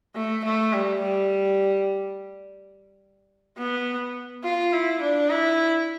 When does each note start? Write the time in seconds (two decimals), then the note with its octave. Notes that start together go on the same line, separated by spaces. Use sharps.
0.15 A3
0.44 A3
0.73 G3
1.01 G3
3.58 B3
4.44 F4
4.73 E4
5.02 D4
5.30 E4